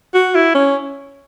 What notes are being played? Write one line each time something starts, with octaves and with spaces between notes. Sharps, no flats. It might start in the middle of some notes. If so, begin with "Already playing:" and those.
F#4
E4
C#4